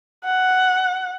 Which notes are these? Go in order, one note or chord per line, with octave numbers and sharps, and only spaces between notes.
F#5